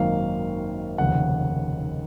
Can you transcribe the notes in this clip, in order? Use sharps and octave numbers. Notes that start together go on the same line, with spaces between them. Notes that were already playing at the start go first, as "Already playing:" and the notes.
Already playing: G#1 F#2 D#3 A#3 F5
F1 D#2 C#3 F#5